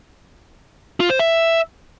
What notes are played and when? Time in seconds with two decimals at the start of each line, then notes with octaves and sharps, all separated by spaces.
1.00 F4
1.10 C5
1.19 E5